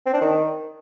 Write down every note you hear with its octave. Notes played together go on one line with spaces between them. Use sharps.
C4
D4
D#3